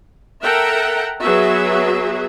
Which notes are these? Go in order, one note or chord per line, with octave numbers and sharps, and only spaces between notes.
A4 A#4 E5 F#5 G5 A#5
F#3 B3 F#4 G#4 E5